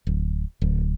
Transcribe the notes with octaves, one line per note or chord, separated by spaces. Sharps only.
D1
D1